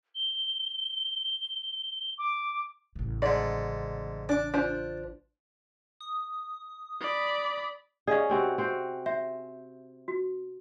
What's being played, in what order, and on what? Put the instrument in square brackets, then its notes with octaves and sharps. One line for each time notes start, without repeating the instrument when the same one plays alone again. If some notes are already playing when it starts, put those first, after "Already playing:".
[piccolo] G7
D6
[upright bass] A1 C#3
[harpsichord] G#2 D3 [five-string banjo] D5
[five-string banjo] D4 [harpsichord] D5 D6
[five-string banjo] D4 F4 C5
[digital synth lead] D#6
[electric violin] D5 B5
[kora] C#4 G#4 [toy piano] D5 D#5 F5
[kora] C3 C4 F#4
C4 F#4 C5
[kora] C5 [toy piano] E5
[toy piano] F#4